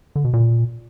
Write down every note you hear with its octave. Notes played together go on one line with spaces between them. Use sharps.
D3
B2
A#2